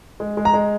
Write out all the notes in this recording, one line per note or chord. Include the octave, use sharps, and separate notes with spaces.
G#3
G#3
A#5
G#3